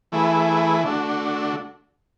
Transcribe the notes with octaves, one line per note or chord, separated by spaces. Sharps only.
E3 A3 E4 G#4 B4
D3 A3 D4 F#4